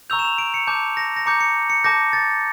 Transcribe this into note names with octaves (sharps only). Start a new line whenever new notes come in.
A#5 C#6 E6 G6 F7
E7
F7
D7
C#7
A5 D6 G6
A#6
A#6
A#5 D6 G6 C#7
C#7
C#7
A5 D6 G6 A#6
A6